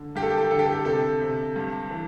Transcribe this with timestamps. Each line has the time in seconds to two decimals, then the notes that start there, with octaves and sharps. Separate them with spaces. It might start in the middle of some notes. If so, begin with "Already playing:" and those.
Already playing: D3
0.15 G2 G4
0.22 A4
0.30 G4
0.37 A4
0.44 G4
0.51 D3 A4
0.59 G4
0.66 A4
0.73 G4
0.85 C3 A4
1.21 C3
1.56 G2
1.90 E3